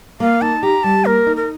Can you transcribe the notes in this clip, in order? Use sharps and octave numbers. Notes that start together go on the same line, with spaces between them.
A#3 F5
D#4 A5
G4 A#5
G3 A5
A#3 A#4
D#4
A#4